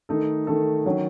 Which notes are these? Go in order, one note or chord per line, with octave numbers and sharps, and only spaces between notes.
D#3 A3 D#4 A4
D#3 A3 D#4 A4
D#3 F#3 C#4